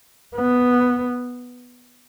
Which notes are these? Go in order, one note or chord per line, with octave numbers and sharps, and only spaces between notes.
B3